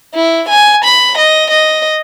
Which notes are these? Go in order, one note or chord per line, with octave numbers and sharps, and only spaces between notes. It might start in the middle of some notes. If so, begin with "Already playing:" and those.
E4
G#5
B5
D#5
D#5